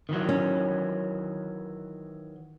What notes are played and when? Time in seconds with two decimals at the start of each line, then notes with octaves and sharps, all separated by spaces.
0.09 D#3 E3 F#3
0.29 C#4